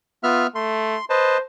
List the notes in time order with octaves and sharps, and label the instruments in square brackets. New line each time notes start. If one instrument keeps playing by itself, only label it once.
[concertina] B3 E5 F6 [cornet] F4
[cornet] A3 [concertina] C6
[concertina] B4 D#5 A5 [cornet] C5